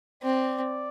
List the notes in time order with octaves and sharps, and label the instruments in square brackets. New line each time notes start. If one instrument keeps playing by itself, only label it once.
[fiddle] C4 [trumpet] D5